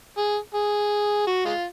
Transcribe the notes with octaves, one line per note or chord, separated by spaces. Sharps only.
G#4
G#4
F#4
G#3 F4